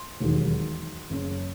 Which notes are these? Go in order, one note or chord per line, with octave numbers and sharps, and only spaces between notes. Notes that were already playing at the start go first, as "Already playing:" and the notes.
Already playing: C6
E1 D#2 D#3 F#3
F#1 F#2 C#3